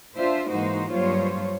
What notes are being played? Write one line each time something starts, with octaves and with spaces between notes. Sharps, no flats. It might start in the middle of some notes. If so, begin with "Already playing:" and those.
D4 F4 C5 E5
G#2 E3 A#3 D#4 F#4 C5
G2 F#3 F4 C5 C#5